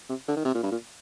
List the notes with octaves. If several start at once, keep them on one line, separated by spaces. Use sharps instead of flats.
C3
D3
D#3
C3
A#2
G2
A#2